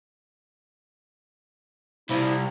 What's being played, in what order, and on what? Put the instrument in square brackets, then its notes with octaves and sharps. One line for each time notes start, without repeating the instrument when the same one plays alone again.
[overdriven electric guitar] C2 C3 [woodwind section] F3 G3 E4